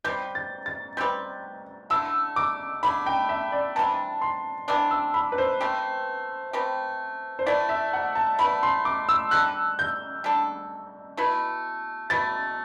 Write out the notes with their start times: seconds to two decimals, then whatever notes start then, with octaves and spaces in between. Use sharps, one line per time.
0.04 G3 C4 G4 B4 G6
0.35 A6
0.66 A6
0.97 G3 C4 G4 B4 G6
1.90 D3 A3 E4 E6
2.36 D6
2.83 D3 A3 E4 B5
3.06 G5
3.29 E5
3.52 D5
3.76 C3 E3 G3 D4 A5
4.22 C6
4.68 C3 E3 G3 D4 D6
4.91 E6
5.14 B5
5.32 B4
5.38 C5
5.61 A3 C4 G4 B4
6.53 A3 C4 G4 B4
7.39 C5
7.46 A3 E4 B4 D5
7.69 E5
7.93 F#5
8.15 A5
8.39 A3 E4 B4 B5
8.63 C6
8.85 D6
9.09 E6
9.31 G3 D4 A4 F#6
9.79 G6
10.24 G3 D4 A4
11.17 B2 A3 E4 B4
12.10 B2 A3 E4 B4 A6